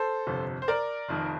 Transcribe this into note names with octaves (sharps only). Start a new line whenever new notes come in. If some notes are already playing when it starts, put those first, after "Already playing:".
Already playing: A4 C5
G1 F2 C3
C5
A#4 D5
F1 F2 D#3